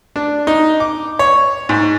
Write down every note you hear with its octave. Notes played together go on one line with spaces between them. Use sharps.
D4
D#4
D6
C#5
G#2